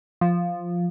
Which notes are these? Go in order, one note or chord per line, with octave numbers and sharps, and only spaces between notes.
F3